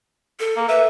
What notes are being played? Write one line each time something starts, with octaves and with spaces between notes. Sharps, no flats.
A4
A#3
B4 E5